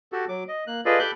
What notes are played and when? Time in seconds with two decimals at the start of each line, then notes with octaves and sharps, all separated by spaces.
0.12 F#4 G4 A4
0.29 F#3 D6
0.48 D#5
0.67 A#3 F#6
0.85 F4 G#4 A4 B4 D5 D#5
0.99 G4 A4 B5 D6 F#6 G6